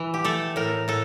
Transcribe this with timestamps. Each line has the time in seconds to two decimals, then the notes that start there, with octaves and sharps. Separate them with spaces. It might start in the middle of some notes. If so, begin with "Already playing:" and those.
Already playing: E3
0.14 G4
0.24 A3 A4
0.56 A2 A#4
0.88 A2 A4